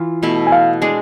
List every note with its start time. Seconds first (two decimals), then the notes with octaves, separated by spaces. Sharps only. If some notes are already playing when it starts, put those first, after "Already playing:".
Already playing: E3 F4
0.23 B2 A3 E4
0.47 G#5
0.52 F5
0.82 G#3 D4 G#4